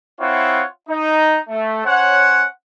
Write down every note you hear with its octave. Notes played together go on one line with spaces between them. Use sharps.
C4 E4 F4 C#5 F#5
D#4
A3
C#4 C5 C#5 F#5